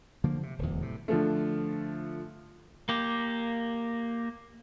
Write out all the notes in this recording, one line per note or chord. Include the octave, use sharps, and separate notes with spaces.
D3 F3 A#3
C3
D1 E2
A2 C3
D3 F3 A3
A#3 G4